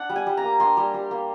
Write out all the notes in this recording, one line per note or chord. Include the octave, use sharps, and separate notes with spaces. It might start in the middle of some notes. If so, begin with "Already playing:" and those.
Already playing: D4 F#5
G3
G#5
G3
A#5
A#3
D4 C6
G3
G3
A#3